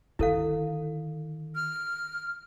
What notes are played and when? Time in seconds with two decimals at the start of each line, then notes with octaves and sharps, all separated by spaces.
0.19 D3 D#3 E4 A4 F5
1.55 F6